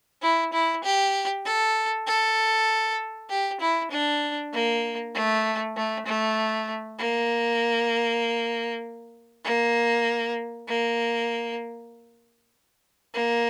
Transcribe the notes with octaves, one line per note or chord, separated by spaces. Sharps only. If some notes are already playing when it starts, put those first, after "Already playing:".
E4
E4
G4
A4
A4
G4
E4
D4
A#3
A3
A3
A3
A#3
A#3
A#3
A#3